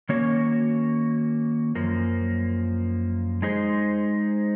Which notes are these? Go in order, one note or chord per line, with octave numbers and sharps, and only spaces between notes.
D#3 A#3 C#4 F#4 C#5
F#2 F3 A#3
G#3 D#4 G#4 C5